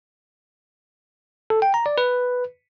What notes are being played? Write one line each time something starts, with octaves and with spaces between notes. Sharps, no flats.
A4
G5
A#5
D5
B4